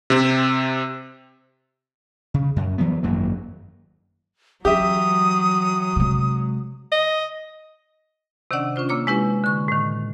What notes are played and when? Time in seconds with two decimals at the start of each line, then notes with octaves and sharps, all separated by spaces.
0.10 C3 C4
2.34 C#3
2.56 F#2
2.78 E3 F#3 B3
3.03 G#1 F#2 F#3 A#3
4.65 E3 F#3 G4 E5 D#6
5.96 C3 G#3
6.92 D#5
8.51 C3 D#3 C#4 D4 D5 F#5
8.76 C#4 D4 F4 C5
8.89 C3 A#3 C#5 D6
9.07 G#3 C#4 E4 G4 B4
9.44 D3 C#6
9.68 A2 D#3